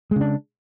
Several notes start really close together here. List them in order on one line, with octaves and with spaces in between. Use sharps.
G#3 C#3 D4